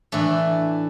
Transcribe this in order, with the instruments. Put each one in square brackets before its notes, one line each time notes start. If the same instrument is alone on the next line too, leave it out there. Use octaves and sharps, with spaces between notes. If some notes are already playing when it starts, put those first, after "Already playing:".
[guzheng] A2 E3 A3 D4